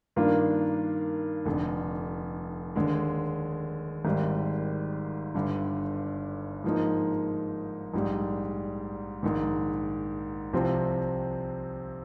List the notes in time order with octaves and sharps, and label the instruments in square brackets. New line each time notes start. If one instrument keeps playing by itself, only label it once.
[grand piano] G2 D#3 A#3 D4 F4
F1 F2 D3
D#2 D3 G#3
G#1 G#2 D#3 G3
G1 G2 D3
G#2 F3 A#3 D#4
A#1 G#2 G3
A#1 G#2 D#3
C2 C3 F3 C4